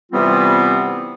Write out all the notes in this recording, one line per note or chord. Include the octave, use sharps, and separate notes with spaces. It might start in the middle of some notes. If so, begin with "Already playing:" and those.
C3 E3 G3 B3 C4 F4